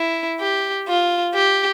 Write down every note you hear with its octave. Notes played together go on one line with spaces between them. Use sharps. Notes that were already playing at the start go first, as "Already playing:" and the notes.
Already playing: E4
G4
F4
G4